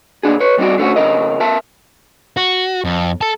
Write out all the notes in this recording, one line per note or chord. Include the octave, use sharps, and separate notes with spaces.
A#2 D3 D4 G#4
B4 C#5
G3 C4 D#4 F#4 D5
D3 A3 C#4 F#4
F2 C#3 A#4 D#5
A#4 E5 A5
F#4
F2
A4 A5